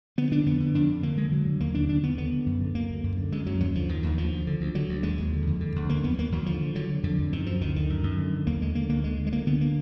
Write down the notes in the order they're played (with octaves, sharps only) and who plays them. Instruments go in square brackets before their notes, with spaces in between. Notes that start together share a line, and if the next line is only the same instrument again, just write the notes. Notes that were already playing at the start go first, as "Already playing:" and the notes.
[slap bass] D3 B3
D3 D4
F2 B3
D3
F2 D4
D3
D3 A#3
D3 G#3
D3 F#3
D3
D#2 A#3
D3 D4
D3 D4
D#2 B3
D3 B3
D3
F#2
D3
D2 A#3
D2
F#2
D3
F#2 G#3
F#2 F#3
D#2 F#3
D3 F3
D#2 D#3
D#2 D#3
D2 F3
D2
D3
D2
D3 F#3
D2
D#2 G#3
D#2
D3
F2
D3
D2
D3 A#3
F2 B3
D#2 A#3
D#2 F#3
D3 F3
D3
D3 F#3
D3
F2 D3
F2
F#2 D#3
F#2 F3
D2 D#3
D3 D#3
F#2
F#2
D3
D3
D#2 A#3
D3 G#3
D3 A#3
D2 A#3
D3 G#3
D3
G#3
D2 A#3
D3 B3
A#3